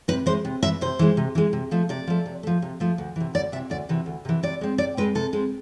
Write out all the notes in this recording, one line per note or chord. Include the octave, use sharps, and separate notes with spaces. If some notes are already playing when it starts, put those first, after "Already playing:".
C3 B4
E3 G#3 C5
C3
E3 G#3 E5
C3 C5
E3 G#3
C3
E3 G#3
C3
F3 A3
C3 D5
F3 A3
C3
F3 A3
C3
F3 A3
D2
C3 E3
D2 D5
C3 E3 E5
D2 D5
C3 E3
D2
C3 E3
C3 D5
G#3 C4
C3 D5
G#3 C4 B4
C3 A4
G#3 C4